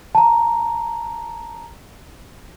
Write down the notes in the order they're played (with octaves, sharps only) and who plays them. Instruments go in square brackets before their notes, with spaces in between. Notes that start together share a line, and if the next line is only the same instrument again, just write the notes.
[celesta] A5 A#5